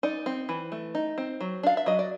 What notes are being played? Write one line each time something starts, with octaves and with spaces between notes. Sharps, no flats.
D#4 D5
C4
E3
A3
D#4
C4
F#3
D4 F5
E5
F#3 D#5
D5